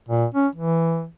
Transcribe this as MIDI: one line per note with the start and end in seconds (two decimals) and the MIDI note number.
0.09 0.25 46
0.34 0.47 61
0.55 1.06 52